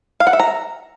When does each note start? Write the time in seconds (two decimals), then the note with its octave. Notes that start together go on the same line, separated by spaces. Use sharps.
0.20 F5
0.27 F#5
0.33 E5
0.40 A#5